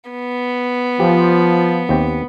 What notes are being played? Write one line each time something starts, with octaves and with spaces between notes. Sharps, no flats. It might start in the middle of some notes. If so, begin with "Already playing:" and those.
B3
F3 G4
D#2 C4 G4